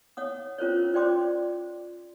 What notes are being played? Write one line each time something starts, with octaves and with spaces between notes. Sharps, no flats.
C#5 F#5 D#6
C#4 F4 A#4 C5 C#5
F4 C5 D5 G5 C6 D6